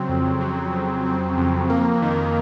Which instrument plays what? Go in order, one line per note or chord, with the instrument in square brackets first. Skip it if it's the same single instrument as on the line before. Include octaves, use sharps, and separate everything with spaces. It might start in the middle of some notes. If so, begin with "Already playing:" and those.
Already playing: [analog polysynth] C#3 F#3 C4
F2
F#3
C#3
C4
F2
A#3
D#3